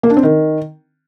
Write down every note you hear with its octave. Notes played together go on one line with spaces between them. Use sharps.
A#3
D4
C4
D#3